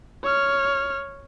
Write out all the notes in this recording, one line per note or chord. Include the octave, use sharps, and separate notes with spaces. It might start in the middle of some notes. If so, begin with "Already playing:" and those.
C#5 F6